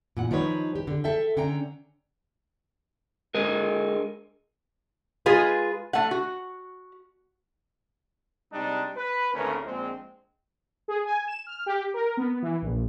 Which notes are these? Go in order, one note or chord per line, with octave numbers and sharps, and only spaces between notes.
A#2 E3 F#5
D#3 F3 G3 D#4 B4 C#5
G4
D3
A4 E5 G5
D3 C#4 G5 A#5
D3 G#3 G#4 A#4
G#3 F4 G#4 B4
A3 F#5
F#4
C3 G3 G#3 D4 D#4 G4
B4
G#1 D2 C#3 A3 C#4 A#4
A#1 G#3 C4
G#4
G#5
E7
F6
G4
A#4
B3
E3
A#1